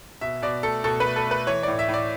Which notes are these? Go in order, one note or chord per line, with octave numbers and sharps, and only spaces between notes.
B2 E5
B2 D5
A3 A4
B2 A4
A3 B4
A4
A3 B4
E3 C#5
A2 D5
E5
A2
D5